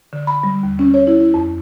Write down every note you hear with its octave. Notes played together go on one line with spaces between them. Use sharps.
D3
B5
G3
D#2
C#4
C#5
E4
E4
F2